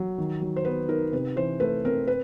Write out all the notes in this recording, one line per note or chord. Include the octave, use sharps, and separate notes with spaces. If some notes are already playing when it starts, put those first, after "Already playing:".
Already playing: F#3
D#3
F#3
C5
B3 B4
D#4 A#4
C3 B4
E3 C5
A3 B4
C4 A#4
B4